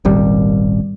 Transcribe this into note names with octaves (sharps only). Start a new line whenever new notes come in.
D#1 G#1 D#2 G3